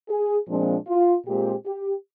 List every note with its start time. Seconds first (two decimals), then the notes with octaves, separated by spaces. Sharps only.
0.09 G#4
0.48 A#2 F3 G#3 C4 D4
0.88 F4
1.27 A#2 G#3 C4 G4
1.66 G4